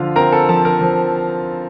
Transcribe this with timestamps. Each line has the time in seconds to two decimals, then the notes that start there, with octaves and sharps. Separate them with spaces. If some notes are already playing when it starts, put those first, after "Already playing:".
Already playing: D3 F3 F4 F5
0.16 C4 A#4 A#5
0.32 A4 A5
0.48 F3 A4 A5
0.65 A#4 A#5
0.81 F3